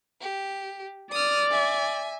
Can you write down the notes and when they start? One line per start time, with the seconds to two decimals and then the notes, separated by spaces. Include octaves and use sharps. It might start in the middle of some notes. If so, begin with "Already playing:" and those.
0.21 G4
1.12 D5 D#6 F6
1.51 E5 G#5